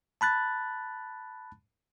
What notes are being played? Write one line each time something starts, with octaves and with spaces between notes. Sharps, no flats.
A5 B5 F#6 A6